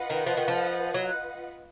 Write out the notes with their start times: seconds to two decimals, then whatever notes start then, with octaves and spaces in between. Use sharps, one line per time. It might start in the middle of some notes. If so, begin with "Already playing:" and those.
Already playing: F4 B4 D#5 F#5
0.10 D#3
0.26 F3
0.37 D#3
0.48 F3
0.94 F#3